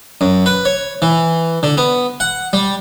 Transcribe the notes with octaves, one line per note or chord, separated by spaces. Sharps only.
F#2
B4
C#5
E3
D3
B3
F#5
G3